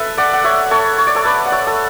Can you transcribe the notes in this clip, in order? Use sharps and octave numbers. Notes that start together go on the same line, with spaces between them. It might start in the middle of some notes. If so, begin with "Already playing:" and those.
Already playing: A4 B4 E5
D5 F#5
F#5
C#5 E5
A4 C#5
C#5
D5
A4 C#5
B4 D5
F#5
C#5 E5
A4